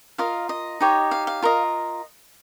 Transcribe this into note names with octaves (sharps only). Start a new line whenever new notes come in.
F4 A#4 D#5 F5
D#5
D#4 G4 C#5
F5
F5
F4 A#4 D#5